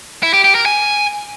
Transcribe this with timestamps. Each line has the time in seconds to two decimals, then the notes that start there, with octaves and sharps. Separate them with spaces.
0.23 E4
0.34 G4
0.44 G4
0.55 A#4
0.66 G#5